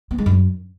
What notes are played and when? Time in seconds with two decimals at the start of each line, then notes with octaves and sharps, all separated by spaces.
0.11 B3
0.18 G#3
0.26 F#2